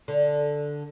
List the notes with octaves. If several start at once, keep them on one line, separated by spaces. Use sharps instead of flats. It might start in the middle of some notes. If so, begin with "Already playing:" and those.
D3